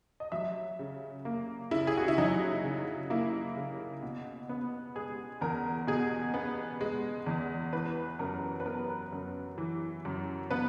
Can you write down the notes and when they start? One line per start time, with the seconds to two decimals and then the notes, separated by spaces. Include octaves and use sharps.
0.20 D#5
0.32 F#3 E5
0.79 C#3
1.25 A#3
1.71 C#3 E4
1.87 G#4
1.97 F#4
2.08 E4
2.18 F#3 D#4
2.64 C#3
3.10 A#3 E4
3.57 C#3
4.03 B2
4.49 B3
4.96 G#3 G#4
5.41 E2 A#4
5.87 B2 G#4
6.34 B3
6.81 G#3
7.26 E2
7.73 E3 B4
8.19 F#2 A#4
8.60 B4
8.65 B3 A#4
9.12 F#2
9.58 E3
10.05 F#2
10.51 B3 B4